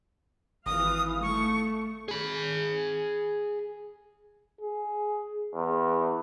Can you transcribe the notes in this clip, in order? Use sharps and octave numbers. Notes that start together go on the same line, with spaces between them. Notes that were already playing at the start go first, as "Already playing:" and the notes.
G#1 E3 F5 D#6
A3 C#6
G#4 B5
G#4
E2